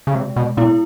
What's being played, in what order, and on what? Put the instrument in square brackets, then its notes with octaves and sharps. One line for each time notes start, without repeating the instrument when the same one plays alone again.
[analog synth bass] C#3
[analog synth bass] C3 [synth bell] G#3
[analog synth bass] B2
[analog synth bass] A#2 [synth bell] B3 E4